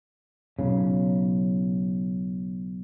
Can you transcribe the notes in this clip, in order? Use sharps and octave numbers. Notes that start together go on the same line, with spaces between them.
B1 C#3